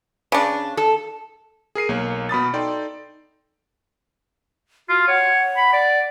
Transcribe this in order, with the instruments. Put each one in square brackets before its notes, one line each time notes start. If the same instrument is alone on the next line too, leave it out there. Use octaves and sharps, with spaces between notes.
[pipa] C#3 D4
[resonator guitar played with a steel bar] A4
[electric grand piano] G#4 A#4 C7 D#7
B1 A#3 C#5
B2 B5 D#6 A6
D#4 A4 D5 G5 C6
[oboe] F4 [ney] F#4
[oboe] C#5 [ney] F#5
[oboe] B5
D5